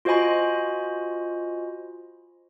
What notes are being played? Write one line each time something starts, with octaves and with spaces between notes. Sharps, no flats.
F4 F#4 C5 D#5 G#5 B5